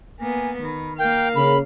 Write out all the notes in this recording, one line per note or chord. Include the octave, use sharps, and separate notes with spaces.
A#3 B3 G#5
D#3 B5
A#3 A#4 F5 G5
C#3 B5